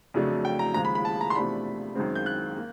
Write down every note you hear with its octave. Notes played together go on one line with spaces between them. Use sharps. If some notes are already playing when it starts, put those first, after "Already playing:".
F2 C#3 F#3 A3 D4
G5
A#5
D#2 C#3 F3 G#3 A#5
B5
B5
A5
A#5
C6
E2 C3 F3 A3 D4 B5
F#2 D#3 G#3 C4
G6
F#6
A#3